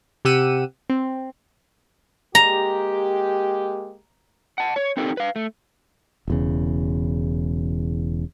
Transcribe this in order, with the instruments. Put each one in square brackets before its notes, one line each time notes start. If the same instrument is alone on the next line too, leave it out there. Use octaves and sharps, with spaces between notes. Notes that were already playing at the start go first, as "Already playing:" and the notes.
[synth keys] C3 G4 F#5 E6 D#7
C4
[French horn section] G#3 A#3 G4 [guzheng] A#5
[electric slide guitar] F#5 A5
C#5
C4 D#4 G4 A4 A#4
B4 F5
A3
[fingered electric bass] E1 E2 C#3